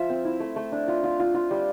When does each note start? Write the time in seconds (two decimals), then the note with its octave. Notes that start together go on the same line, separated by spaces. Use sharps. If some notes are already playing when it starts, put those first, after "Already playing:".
Already playing: F3 F4 E5
0.09 C4
0.25 E4
0.40 A3
0.56 A3
0.72 D4
0.88 F4
1.04 F4
1.20 F4
1.35 F4
1.51 G3